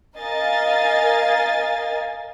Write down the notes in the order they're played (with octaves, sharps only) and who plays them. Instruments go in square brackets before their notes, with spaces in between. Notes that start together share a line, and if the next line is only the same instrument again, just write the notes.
[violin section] A#4 D#5 F5 G#5 A6